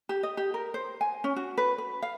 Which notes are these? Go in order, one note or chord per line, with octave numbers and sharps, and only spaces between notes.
G4
D#5
G4
A#4
C5
G#5
C#4
F#4
B4
B4
F5